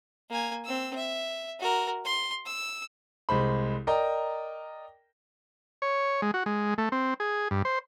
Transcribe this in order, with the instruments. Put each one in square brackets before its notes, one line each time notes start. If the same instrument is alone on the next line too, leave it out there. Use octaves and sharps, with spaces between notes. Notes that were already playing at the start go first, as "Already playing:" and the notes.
[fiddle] A#3 G#5
C4 E6
E5
F#4 A#4
C6
E6
[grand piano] C2 G#3 C5 B5
A#4 D5 D#5 G5 A#5
[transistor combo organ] C#5
G#3
F#4
G#3
A3
C4
G#4
G2
C5